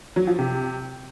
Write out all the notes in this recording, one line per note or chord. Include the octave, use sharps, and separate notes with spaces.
F#3
F3
C3